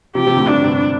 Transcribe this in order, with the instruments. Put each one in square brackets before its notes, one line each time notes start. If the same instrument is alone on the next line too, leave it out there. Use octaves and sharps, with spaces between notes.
[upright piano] C3 F3 [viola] G4
[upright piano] C3 F3
A2 D3
[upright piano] G2 C3 [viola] D4
[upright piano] G2 C3